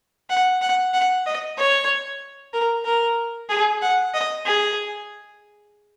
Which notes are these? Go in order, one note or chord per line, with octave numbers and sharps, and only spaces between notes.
F#5
F#5
F#5
D#5
C#5
A#4
A#4
G#4
F#5
D#5
G#4